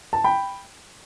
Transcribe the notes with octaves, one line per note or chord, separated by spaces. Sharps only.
A5
G5 B5